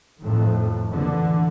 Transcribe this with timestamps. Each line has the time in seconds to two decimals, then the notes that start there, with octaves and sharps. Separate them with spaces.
0.21 F2 A2 D#3
0.92 D3 E3